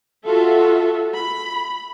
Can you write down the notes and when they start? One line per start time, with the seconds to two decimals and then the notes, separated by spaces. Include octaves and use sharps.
0.25 F4 F#4 A4 E5
1.16 B5